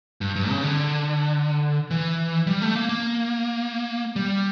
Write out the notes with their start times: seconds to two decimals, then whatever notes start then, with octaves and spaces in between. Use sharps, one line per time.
0.21 G2
0.36 G2
0.50 C#3
0.63 D3
1.91 E3
2.47 G3
2.62 A3
2.75 A#3
2.89 A#3
4.16 G3